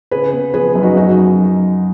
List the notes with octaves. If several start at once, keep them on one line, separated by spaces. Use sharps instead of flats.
C#3 G#4 B4
B3
F3 G#4 B4
F#2
D#4 F#4
F#2 D#4 F#4
F#2